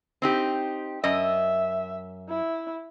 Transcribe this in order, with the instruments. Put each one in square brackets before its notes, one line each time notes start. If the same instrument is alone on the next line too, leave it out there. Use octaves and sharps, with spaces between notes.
[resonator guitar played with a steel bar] C4 D#4 G4
[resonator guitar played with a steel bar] F#2 D#5 [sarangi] E5
[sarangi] E4